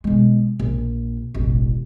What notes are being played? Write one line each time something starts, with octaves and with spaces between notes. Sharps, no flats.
B1 G#3
A#1
E1 A1